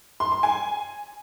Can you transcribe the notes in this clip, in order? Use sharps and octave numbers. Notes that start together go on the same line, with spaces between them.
C6
C6
G#5